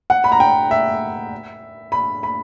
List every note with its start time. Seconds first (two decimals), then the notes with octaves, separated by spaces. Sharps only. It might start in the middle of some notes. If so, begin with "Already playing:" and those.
0.10 F#5
0.24 B5
0.32 A#5
0.40 G5
0.71 E5
1.92 B5
2.23 B5